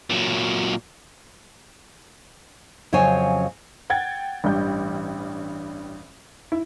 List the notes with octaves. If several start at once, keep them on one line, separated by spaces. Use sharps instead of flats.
A#2 F#3
F2 C#3 F#3 C5 C#5 G#5
F#5 G5 G#6 A6
A1 G2 G3 G6
E4